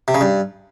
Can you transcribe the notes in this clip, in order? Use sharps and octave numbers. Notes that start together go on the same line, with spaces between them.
C3
C#3
G2